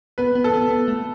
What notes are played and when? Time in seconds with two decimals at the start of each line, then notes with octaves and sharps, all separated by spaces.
0.18 B3 B4
0.35 B3
0.44 A4
0.53 B3
0.71 B3
0.88 A3